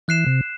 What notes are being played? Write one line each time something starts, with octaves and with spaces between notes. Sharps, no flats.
E3 F#6 C7 E7
C3